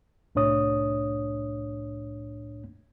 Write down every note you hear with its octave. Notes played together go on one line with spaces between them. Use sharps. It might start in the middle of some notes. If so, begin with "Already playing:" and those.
C2 A2 D4 C#5 D#6